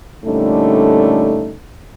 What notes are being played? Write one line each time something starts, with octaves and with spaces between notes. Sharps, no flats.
A#2 D3 G3 A3 C#4 D#4